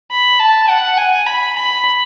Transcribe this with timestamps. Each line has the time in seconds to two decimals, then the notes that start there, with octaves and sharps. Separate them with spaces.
0.11 B5
0.39 A5
0.69 F#5
0.97 G#5
1.26 B5
1.56 B5